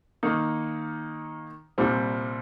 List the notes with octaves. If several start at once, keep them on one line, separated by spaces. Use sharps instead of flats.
D#3 A#3 D#4
C2 A#2 G3 C4